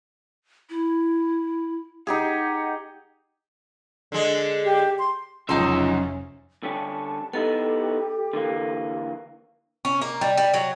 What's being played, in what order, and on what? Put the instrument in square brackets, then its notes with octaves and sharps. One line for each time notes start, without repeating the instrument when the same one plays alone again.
[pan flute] E4
[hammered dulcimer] D#4 G4 G#4 [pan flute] F#5
[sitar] D3 G#3
[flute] G4
C6
[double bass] F1 C#4 [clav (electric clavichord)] C#2 [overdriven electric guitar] F#2 E5 [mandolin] D#4 C6
[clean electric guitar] D3 G3 C#4 [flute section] A5
[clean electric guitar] B3 D#4 E4 [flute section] G4 [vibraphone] A4
[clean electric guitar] D3 E3 A#3
[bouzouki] C#4
A#3
G3
G3
F#3